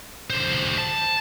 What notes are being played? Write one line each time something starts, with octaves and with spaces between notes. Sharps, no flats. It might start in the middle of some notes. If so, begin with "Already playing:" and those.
D3 C5
A5